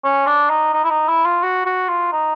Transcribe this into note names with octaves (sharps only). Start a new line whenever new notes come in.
C#4
D4
D#4
D#4
E4
D#4
E4
F4
F#4
F#4
F4
D#4